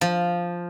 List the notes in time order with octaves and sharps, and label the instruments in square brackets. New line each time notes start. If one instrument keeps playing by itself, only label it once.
[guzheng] F3